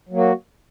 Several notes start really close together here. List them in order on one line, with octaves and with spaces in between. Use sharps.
F#3 A#3 F#4